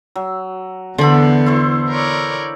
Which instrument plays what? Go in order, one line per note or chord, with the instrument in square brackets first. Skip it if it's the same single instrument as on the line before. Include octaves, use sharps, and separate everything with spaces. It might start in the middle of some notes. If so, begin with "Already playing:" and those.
[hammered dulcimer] F#3
[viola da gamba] E2 B3 [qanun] D3 B5 [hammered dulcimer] A4 C5
[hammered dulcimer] E4 C5 C#6
[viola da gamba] A#4 C#5 D5